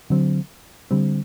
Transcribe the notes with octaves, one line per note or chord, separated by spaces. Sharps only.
D3 F#3 C4
D3 G3 C4